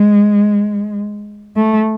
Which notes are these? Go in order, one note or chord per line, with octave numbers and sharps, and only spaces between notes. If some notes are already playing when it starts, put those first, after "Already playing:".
Already playing: G#3
A3